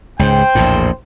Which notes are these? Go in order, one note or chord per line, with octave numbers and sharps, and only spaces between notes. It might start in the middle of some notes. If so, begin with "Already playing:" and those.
C#2 G#2 C5 G5
A#1 E2 A2